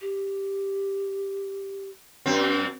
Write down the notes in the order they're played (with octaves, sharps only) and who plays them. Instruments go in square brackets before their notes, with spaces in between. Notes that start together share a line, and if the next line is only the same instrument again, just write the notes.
[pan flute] G4
[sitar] F#2 C4